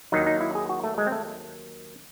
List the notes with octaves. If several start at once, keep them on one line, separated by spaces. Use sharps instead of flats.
D#2 D#3 F#3 D#4
D#4
E4
G#4
F#4
A3
G#3
C4
A3